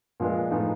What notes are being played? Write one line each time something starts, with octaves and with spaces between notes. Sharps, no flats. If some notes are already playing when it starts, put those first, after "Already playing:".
A#2 F3 G#3 B3 D4
A2 F3 G#3 B3 D#4